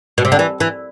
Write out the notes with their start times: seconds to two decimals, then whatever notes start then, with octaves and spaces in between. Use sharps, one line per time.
0.18 B2
0.25 C3
0.32 D3
0.39 E3
0.60 E3